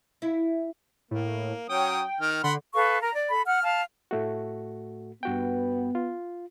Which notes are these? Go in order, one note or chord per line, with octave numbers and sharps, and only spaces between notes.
E4
A2 A#3
F#3 C#4 G5 D#6
D#3 F6
D3 F#5 B5 C6
A4 B4 F5 C#6
A#4 A#5
D5
A4 B5
F#5 F6
F5 A5
A2 A3 F#4
G2 B3 F#4 G5
F4